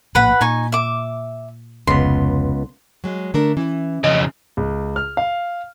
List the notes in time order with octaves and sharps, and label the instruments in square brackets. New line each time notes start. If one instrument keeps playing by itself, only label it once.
[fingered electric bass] A#1 A2 A#3 [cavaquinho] B4 F#5 B5
[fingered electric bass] A#2 [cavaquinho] D#4 G#5 C#6
[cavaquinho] E5 D6
[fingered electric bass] F1 [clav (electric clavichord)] C#2 B3 [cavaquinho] C6
[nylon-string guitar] F#3 G#3
[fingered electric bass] D3 [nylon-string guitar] A3 D4 A#4
[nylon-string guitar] E3 [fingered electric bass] C#4
[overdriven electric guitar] F2 C#3 [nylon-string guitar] D#5
[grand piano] C#2
F6
F5